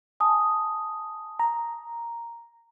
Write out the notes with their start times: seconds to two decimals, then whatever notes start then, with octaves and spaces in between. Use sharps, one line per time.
0.20 G#5 A5 D#6
1.39 A#5